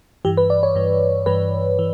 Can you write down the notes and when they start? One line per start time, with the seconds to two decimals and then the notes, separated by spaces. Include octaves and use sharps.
0.25 G2 E3 G4
0.37 B4
0.50 D5
0.63 C#5
0.76 G2 E3
1.26 G2 E3 B4
1.79 E3